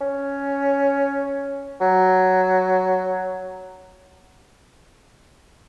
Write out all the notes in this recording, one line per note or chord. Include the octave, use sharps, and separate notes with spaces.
C#4
F#3